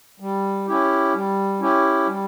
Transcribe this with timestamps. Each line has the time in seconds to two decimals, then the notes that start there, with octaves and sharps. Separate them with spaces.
0.20 G3
0.67 C#4 E4 G4
1.14 G3
1.60 C#4 E4 G4
2.06 G3